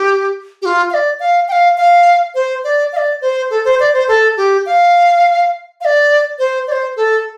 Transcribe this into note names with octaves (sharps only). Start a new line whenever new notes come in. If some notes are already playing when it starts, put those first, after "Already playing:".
Already playing: G4
G4
F4
F5
D5
F5
G5
F5
F5
C5
D5
F5
D5
C5
A4
C5
D5
C5
A4
G4
F5
F5
D5
C5
D5
C5
A4